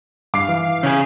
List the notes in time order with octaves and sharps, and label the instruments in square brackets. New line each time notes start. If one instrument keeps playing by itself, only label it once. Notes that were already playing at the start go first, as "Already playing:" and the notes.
[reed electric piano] G2 [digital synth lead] F5 [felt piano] D6 C7
[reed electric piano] E3
[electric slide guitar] C#3 G#4